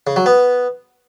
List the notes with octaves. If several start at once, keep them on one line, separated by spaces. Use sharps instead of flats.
C#3
F#3
B3